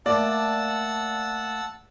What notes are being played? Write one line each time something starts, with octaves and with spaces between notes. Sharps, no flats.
A3 A#3 D5 F#5 A5 E6